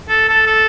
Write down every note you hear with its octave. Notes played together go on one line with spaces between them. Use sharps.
A4
A4
A4